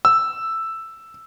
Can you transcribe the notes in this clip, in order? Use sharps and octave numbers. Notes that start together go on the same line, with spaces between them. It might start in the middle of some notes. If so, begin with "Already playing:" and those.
E6